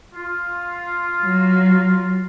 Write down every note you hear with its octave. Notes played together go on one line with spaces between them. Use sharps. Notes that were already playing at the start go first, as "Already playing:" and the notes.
F4
F#3